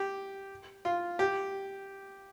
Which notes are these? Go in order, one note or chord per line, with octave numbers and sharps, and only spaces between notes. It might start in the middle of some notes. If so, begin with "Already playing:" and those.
Already playing: G4
F4
G4